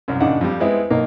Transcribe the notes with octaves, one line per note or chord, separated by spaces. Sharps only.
C2 F#2
A#1 C#3 D4 D#4 F#5
F2 G3
G#3 B3 C4 E4
B1 A#3 D#4